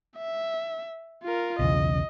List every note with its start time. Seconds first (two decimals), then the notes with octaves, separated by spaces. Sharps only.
0.17 E5
1.23 F4 A#4
1.59 B1 E2 C#3 D#5